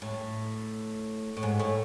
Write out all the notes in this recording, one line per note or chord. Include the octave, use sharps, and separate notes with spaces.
A2
A2
G#2
A2